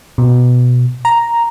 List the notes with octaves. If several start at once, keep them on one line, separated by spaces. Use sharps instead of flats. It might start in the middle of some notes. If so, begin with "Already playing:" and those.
B2
A#5